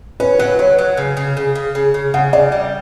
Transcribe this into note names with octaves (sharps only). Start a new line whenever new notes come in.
C#4 B4
F#3 B4
F#3 C#5
F#3
C#3
C#3
C#3
C#3
C#3
C#3
C#3 F#5
C#3 D5
G3